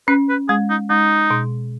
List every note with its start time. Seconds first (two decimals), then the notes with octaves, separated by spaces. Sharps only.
0.08 C#4 B4
0.29 B4
0.49 G#3 G#4
0.70 D#4
0.90 G#3 D#4
1.31 B2